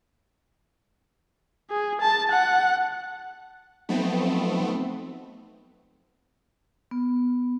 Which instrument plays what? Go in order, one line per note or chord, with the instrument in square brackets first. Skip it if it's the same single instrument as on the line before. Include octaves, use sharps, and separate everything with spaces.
[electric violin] G#4
A5
F#5
[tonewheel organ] F3 F#3 D#4 [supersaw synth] A3 B3 C4
[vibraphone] B3